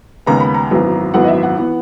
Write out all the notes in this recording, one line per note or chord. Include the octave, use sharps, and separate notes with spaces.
D#2 C#3 G#3 B3 A#5
B5
A#5
G#1 F#2 E3 B3
G#1 F#2 E3 B3 F#5
D#5
E5
F#5
E3 B3